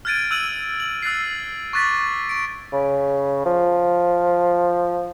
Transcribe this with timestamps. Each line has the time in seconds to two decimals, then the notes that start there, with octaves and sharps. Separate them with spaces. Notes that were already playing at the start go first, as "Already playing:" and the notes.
0.05 F6 F#6 G#6 A6 D7 D#7
0.31 E6 F#6 G#6 D#7 F#7
0.80 F#7
1.02 E6 F#6 A6 C7
1.73 C#6 D6 F#6 A6 B6
2.29 C#6 D7
2.73 C#3
3.46 F3